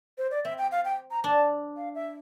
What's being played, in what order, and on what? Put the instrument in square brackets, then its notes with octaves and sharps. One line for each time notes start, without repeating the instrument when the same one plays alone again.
[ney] C5
D5
[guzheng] C4 [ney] E5
[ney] G5
F5
G5
A#5
[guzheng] D4 [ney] A5
[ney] F5
E5